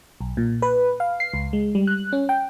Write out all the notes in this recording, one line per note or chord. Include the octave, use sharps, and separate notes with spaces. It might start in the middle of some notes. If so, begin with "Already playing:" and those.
B1
A#2
B4
F5
C7
C#2
G#3
G3
F#6
C#4
G5